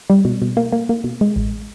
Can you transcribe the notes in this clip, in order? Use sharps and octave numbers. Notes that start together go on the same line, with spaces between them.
G3
B2
B2
A#3
A#3
A#3
B2
G#3
A1